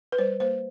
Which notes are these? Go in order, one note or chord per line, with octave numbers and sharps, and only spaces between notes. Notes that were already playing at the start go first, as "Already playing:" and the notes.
B4
G3 C5
A#3 C5